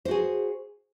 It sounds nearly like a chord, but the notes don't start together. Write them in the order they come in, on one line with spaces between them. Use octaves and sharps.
C5 F#4 G#4